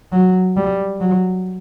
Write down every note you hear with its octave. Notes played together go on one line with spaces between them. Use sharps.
F#3
G3
F#3